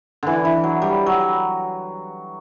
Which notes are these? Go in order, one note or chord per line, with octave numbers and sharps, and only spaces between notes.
D3 E3
E3
F#3
G3
F#3